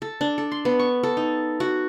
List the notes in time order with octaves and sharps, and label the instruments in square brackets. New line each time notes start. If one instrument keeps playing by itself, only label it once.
[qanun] A4
D4
A4
C6
B3
C#6
A4
D#4
F#4